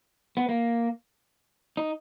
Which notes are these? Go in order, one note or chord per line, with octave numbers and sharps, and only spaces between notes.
B3
A#3
D#4